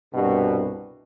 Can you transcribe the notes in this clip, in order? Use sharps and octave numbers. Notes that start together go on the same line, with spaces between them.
C2 G2 B2 G3 F#4